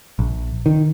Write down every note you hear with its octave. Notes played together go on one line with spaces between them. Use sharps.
A#1
D#3